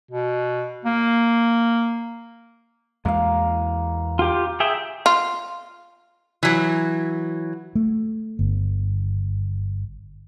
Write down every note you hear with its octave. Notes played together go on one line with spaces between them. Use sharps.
B2
A#3
E2 G#3 A#3 F5
F4 G4
G#4 E5 G5
F4
E3 F#3
A3
G1